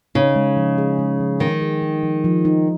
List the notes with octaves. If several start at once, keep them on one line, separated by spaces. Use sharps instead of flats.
C#3 D#4
G#3
F3
G#4
G#3
F3
D#3 G#3
G#4
D#4
F3
F3
D#4